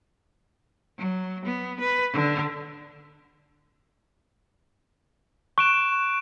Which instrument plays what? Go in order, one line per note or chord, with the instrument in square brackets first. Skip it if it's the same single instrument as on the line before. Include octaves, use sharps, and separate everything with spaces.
[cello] F#3
B3
B4
D3
[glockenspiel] C#6 [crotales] F#6 D7 E7